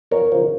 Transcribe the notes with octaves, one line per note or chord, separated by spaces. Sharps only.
F2 A#4 C#5
C#3 F3